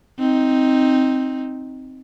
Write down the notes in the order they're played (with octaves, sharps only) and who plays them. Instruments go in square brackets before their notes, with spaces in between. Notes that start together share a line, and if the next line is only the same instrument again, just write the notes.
[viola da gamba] C4 D#4